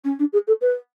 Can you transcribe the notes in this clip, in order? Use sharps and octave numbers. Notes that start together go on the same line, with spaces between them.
C#4
D4
G#4
A4
B4